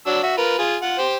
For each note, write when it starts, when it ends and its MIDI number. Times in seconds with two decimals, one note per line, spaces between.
0.06 0.20 54
0.06 0.20 62
0.06 0.20 88
0.23 0.35 66
0.23 0.35 76
0.37 0.55 65
0.37 0.55 70
0.37 0.55 71
0.59 0.76 65
0.59 0.76 68
0.82 0.98 65
0.82 0.98 78
0.99 1.17 67
0.99 1.17 72